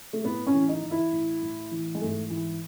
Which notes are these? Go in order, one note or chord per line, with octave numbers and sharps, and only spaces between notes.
A3
A2 B3
C#4
E3
D#4
E3
E4
A2
A2
E3
G#3
G#2 A3
E3